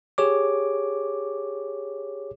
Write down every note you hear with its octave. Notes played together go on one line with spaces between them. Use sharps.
G4 G#4 C#5 D6